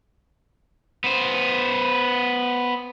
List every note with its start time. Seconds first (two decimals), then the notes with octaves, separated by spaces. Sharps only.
1.04 B3 C5